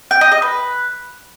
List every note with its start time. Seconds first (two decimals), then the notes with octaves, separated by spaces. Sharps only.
0.11 G5
0.21 D#5
0.32 D#5
0.42 B4